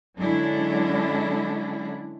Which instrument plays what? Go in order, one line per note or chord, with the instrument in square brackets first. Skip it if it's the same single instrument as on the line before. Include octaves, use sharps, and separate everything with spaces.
[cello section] D3 F#3 G#3 C#4 D4 E4